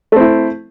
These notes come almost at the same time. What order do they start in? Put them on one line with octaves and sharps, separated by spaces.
A3 C4 E4